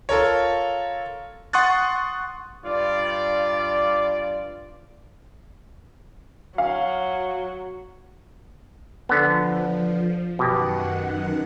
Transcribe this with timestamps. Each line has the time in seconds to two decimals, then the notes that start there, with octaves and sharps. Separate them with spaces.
0.09 F4 A4 A#4 C#5
1.53 F#5 C6 C#6 D#6 F#6 A6
2.65 G2 F4 D5
6.58 F#3 F5
9.09 D3 F3 B3
10.39 F#2 B2 D#3 G4 F#5